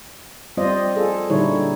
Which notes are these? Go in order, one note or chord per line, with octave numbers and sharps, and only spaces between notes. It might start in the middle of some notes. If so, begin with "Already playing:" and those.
G3 C4 F4 C5 D5 D#5
F4 G#4 A4
A#2 D3 G3 D#4 E4 C#5